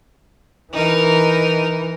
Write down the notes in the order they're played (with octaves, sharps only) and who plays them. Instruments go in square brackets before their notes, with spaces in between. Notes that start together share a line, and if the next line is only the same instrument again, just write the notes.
[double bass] E3 [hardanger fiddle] D#4 A#4